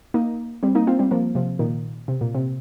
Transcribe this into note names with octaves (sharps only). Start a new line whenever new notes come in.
A#3 D#4
G3 C4
A#3 D#4
C4 F4
G3 C4
F3 A#3
C3 F3
A#2 D#3
C3
A#2
C3